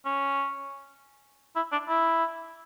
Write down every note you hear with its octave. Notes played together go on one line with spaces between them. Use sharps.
C#4
E4
D4
E4